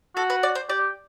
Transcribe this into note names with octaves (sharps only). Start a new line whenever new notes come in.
F#4 A4
B4
D5
C5
G4 D5